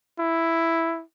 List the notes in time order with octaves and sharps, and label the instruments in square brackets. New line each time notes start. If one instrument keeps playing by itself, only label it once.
[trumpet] E4